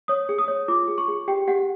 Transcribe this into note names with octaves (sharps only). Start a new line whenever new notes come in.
C#5 D#6
G#4
D#6
C#5
F4 D6
G#4
C#6
G#4
G4 G5
G4 F#5